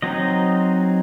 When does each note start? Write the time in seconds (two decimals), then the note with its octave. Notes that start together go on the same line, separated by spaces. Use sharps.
0.02 F#3 C4 D#4 D#5